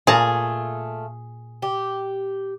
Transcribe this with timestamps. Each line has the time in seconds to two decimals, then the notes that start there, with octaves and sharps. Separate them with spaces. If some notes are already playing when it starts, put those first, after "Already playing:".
0.07 A#2 A3 F4 G#4 A5 A#5
1.62 G4